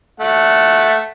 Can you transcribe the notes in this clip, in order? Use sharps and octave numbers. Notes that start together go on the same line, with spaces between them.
A3 F#5